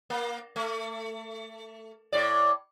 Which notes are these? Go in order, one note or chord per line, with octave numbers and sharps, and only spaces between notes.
A#3
A3
A2 D5